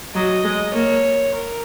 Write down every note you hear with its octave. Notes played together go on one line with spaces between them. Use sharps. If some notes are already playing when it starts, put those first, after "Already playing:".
F#3 D#5
G#3
A#3 C#5
A#4